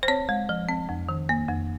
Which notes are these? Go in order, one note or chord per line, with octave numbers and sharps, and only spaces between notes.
C5
C4 C#5
G#3
F3
C4
F2
D#3
A#3
F2